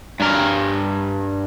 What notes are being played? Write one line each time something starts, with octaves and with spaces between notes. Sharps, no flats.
G2 A#4